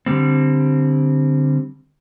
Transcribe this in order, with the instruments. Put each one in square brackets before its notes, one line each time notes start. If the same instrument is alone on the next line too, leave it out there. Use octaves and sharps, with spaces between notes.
[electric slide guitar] D3 G3 C4